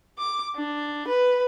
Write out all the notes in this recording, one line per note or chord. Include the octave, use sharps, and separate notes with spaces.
D6
D4
B4